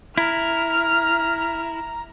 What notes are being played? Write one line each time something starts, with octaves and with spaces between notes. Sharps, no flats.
E4 A#5 F6